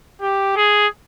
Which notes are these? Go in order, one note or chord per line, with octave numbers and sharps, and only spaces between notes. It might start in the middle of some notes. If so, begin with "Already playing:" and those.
G4
G#4